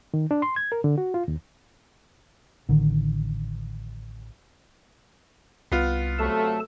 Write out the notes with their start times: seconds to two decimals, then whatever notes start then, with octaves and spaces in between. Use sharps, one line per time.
0.14 D#3
0.31 D4
0.42 C6
0.56 G#6
0.72 A#4
0.84 D3
0.98 F#4
1.14 F4
1.28 D#2
2.69 A1 D3 D#3
5.72 C2 B3 F4
6.19 C3 F#3 A3 A4 A5